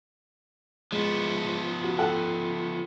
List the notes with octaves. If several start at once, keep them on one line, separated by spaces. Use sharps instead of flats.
F3 G#3 B3
F#4
A4 F#5 G5